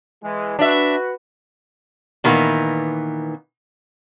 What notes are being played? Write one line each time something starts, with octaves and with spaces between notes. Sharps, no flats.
E3 G#3
D4 F#4 B4 E5
A#2 D#3 E3 A#3 B3